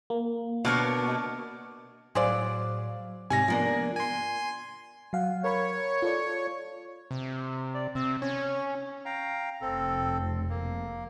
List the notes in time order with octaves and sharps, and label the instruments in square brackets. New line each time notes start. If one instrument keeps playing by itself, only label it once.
[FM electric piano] A#3
[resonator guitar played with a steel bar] B2 [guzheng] D4 A#4 C#5
[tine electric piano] A2 F5 [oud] F#3 [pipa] G#4 C5 D5
[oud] G#2 C#5 [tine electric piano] C3 [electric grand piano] G#5 A#6
[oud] F3 A#3 D4 [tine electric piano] B3 F4
[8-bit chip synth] G#5 C6
[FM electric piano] F#3 F5 F#5
[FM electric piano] A#4 B5 [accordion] C#5
[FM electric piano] F4 A4 D5
[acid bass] C3
[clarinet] D5
[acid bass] C3 [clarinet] C4
[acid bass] C#4 [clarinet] C#5
[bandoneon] F5 G5 A#5
[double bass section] F1 [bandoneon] C4 A4
[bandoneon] A#3